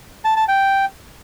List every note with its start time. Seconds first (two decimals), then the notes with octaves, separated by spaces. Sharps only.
0.25 A5
0.36 A5
0.48 G5